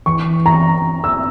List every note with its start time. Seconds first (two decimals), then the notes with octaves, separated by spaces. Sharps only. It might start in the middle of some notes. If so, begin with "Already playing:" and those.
0.06 E3 C#6
0.46 A#5
1.04 E6